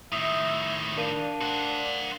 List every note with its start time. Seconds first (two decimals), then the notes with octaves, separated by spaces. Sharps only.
0.12 A2 D#3 E5 D#6
0.97 D4 A#4 F5 D#7
1.41 C5 F#5